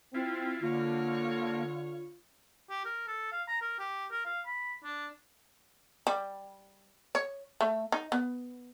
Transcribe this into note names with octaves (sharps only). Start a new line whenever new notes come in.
C4 E4 F4
D3 A#3 F4 C#5 F5
G4
A#4
A4
F5
A#5
A#4
G4
A#4
F5
B5
D4
G3
C#5
A3
D#4
B3